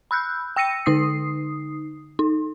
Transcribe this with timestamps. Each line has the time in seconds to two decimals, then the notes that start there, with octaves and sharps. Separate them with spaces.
0.11 B5 E6 F#6 G6
0.56 G5 E6 A#6 C#7 D#7
0.86 D3 D#4 D#6 C7
2.19 D#4